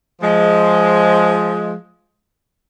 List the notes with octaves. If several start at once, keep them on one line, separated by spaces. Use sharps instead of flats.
F3 G#3